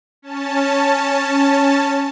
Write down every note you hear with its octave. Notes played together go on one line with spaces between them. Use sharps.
C#4 A5